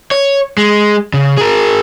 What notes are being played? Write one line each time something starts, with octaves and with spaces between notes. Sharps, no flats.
C#5
G#3
C#3
G#4 A#4